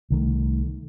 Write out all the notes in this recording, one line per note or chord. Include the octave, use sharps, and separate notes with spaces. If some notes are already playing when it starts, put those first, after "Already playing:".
C2 D#3 A3